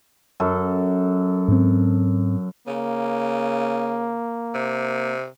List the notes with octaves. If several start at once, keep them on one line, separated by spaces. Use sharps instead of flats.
F#2 A4
G#2 C4
C#3 A#3
C3